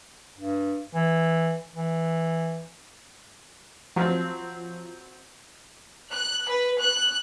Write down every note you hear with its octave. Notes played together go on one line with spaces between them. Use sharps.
G2
E3
E3
F3 F#3 C4
F#6
B4
F#6